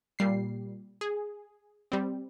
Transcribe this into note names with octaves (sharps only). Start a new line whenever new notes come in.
A#2 G3 C7
G#4
G3 C4